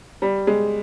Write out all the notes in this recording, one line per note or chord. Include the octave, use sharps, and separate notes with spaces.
G3
G#3